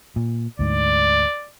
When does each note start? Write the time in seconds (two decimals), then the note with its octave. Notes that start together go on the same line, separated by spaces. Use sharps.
0.16 A#2
0.59 D2 G#2 D5